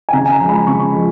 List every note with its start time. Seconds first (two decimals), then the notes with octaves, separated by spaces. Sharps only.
0.09 G#5
0.13 C#3 A#5
0.26 G#5
0.32 A#5
0.40 F3 G#3
0.49 B5
0.67 C#3 C#6
0.95 F3 G#3